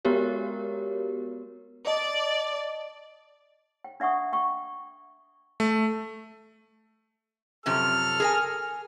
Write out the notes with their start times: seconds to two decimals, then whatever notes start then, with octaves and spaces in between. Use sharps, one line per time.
0.05 G#3 B3 F#4 G4 A#4 C#5
1.87 D5 D#5 A5
3.84 G5
4.00 D4 E5 F#5 C#6 D#6
4.33 G5 C#6
5.60 A3
7.66 F#2 C3 F3 A4 F6
8.20 G#4 A#4 G#5